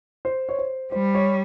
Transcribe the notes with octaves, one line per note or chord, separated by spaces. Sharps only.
C5
C#5
C5
G3 C5
C#5